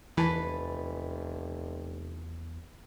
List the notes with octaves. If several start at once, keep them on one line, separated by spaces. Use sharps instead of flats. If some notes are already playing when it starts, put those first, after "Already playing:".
F1 E2 E3 B4 A5 B5